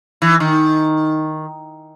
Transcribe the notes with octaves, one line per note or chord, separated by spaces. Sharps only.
E3
D#3